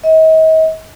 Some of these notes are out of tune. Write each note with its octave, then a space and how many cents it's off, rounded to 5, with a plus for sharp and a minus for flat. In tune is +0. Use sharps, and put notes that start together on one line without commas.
D#5 +40